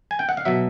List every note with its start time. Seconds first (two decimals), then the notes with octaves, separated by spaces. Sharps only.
0.11 G#5
0.19 G5
0.29 F#5
0.37 F5
0.45 B2 F#3 E5